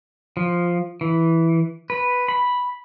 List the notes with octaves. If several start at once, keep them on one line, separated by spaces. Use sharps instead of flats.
F3
E3
B4
B5